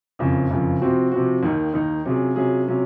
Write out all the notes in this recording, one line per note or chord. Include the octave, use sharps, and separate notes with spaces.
F#1 F2 C#3 F3
F#1 F2 C#3 F3
C3 F3 C4 F#4
C3 F3 C4 F#4
D#2 D#3 A#3 D#4
D#2 D#3 A#3 D#4
C3 F#3 C#4 F4 G#4
C3 F#3 C#4 F4 G#4
C3 F#3 C#4 F4